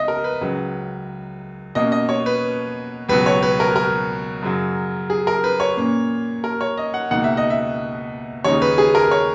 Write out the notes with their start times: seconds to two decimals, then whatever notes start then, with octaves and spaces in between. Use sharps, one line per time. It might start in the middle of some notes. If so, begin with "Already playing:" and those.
Already playing: C#2 B3 D#5 E5
0.08 A#4
0.24 B4
0.41 C#2 C#3 F#3
1.75 B2 A#3 C#4 D#5
1.92 D#5
2.09 C#5
2.26 B4
3.09 C#2 B2 F#3 B4
3.26 C#5
3.43 B4
3.60 A#4
3.76 A#4
4.42 F#2 C#3 F#3
5.10 G#4
5.27 A#4
5.44 B4
5.60 C#5
5.77 A#2 A#3 C#4
6.44 A#4
6.61 C#5
6.78 D#5
6.94 F#5
7.11 C#2 B2 A#3 D#4 F#5
7.24 E5
7.37 D#5
7.50 E5
8.44 D#2 C#3 G#3 D#4 C#5
8.62 B4
8.78 G#4
8.95 A#4
9.11 C#5